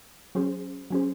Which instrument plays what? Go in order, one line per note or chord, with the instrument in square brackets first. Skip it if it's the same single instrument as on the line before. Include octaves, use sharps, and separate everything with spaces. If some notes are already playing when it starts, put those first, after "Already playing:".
[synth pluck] F#3 C#4 G#4 C5
F#3 C#4 G#4 C5